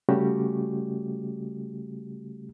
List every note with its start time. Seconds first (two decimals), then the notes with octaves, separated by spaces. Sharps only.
0.09 C#3 G3 A3 C#4 F#4 G4